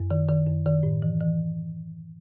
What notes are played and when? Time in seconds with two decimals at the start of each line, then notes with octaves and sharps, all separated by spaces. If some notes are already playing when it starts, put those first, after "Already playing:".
Already playing: F#2
0.11 D#3
0.28 D#3
0.47 F#2
0.66 D#3
0.83 A2
1.02 E3
1.20 E3